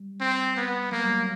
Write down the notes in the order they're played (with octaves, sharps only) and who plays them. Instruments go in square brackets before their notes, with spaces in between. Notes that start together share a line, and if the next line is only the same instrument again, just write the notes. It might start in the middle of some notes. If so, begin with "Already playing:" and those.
Already playing: [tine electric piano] G3
[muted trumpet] C4
B3
[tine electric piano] F#3 [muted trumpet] A#3
[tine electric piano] G3
F#3